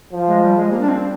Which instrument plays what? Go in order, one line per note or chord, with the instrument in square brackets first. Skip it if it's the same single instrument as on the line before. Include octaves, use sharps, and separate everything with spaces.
[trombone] F3
[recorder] G#3
G3
G#3
[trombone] G3 [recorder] A#3
[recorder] D4
C4